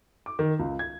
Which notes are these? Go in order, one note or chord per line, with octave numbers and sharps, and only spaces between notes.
D6
D#3
C#2
G#6